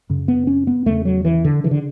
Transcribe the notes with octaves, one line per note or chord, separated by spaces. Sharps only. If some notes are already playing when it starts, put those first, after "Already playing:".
F#2 C#3
B3
C#4
B3
E2 C#3 A3
F#3
E3
D3
C#3 E3
D3